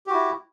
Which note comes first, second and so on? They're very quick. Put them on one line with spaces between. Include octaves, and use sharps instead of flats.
G4 F#4 E4